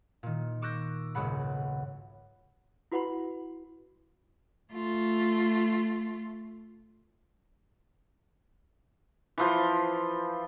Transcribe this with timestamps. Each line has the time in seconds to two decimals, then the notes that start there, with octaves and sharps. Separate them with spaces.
0.23 A#2 D#3
0.62 C#6 D6 E6 F#6 G6 A#6
1.15 D#1 B1 G#2 C#3 F#5 B5
2.92 E4 F#4 B4 F#5 B5 C6
4.72 A3 F4
9.38 E3 F3 C5